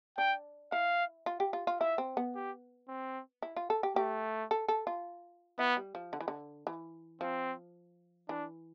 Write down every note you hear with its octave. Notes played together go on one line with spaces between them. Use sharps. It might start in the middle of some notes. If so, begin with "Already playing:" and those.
D4 G5
E4 F5
F4
G4
F4
F4
E4 E5
C4
B3
G4
C4
E4
F4
A4
G4
A3 G4
A4
A4
F4
B3 E4
G3
F3
D3
E3
D3
E3
F3 C4
E3 D4